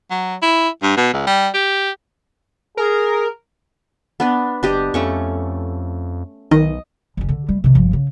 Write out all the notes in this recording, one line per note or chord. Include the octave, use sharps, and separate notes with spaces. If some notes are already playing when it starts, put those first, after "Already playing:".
F#3
E4
G2
B2
C#2
G3
G4
G#4 A#4
B3 D4 B4
F#1 D4 G4 D#5
F2 A3 C#4 C#6
B1 D#3 D#5
F#1 C#4
D3
G3 A3
C3 D#3
G1 F3
C#3